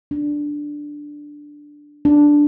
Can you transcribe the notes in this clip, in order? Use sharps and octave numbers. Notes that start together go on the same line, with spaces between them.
D4
D4